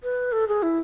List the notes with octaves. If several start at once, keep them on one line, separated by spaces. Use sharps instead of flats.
B4
A4
G#4
E4